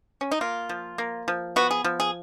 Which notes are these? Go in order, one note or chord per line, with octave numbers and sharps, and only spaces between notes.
C#4
D#4
A#3 F4
F3
A#3
F3
B3 F#4
G#4
F3
G#4